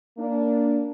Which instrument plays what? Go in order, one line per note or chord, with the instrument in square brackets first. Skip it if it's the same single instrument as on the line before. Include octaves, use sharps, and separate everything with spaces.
[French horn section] A#3 D4